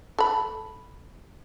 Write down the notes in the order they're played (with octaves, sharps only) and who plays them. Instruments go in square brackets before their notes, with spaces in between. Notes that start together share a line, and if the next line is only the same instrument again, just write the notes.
[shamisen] A4 B5